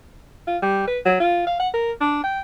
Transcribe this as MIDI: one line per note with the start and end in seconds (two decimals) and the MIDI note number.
0.47 0.57 65
0.62 0.83 55
0.87 0.98 71
1.05 1.16 54
1.20 1.43 65
1.47 1.58 77
1.59 1.69 78
1.74 1.92 70
2.01 2.21 62
2.23 2.41 79